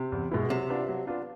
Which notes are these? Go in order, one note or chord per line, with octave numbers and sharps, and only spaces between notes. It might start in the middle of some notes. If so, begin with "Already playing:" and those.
Already playing: C3
E2
B2 G#3 B3 E4
C3 F#3
B3 D4 F4
F#3
B3 D4 F4